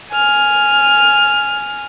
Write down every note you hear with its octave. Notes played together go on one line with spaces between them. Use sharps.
G#5 F6